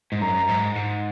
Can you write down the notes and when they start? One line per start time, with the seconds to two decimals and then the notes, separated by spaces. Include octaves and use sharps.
0.12 G#2
0.21 F#2 A#5
0.49 G#2
0.76 G#2